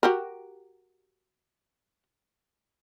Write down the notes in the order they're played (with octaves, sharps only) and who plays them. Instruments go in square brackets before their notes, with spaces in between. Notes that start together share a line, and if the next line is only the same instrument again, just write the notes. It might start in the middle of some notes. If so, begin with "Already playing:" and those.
[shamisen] F#4 G4 A#4